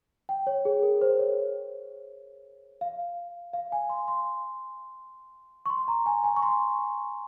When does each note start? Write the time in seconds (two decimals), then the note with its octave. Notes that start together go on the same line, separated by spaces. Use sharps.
0.29 G5
0.47 C#5
0.65 G#4
0.83 A#4
1.01 C5
1.19 C#5
2.81 F5
3.54 F5
3.72 G#5
3.89 C6
4.08 C6
5.66 C#6
5.70 C6
5.88 A#5
6.06 G#5
6.24 G#5
6.36 C#6
6.42 C6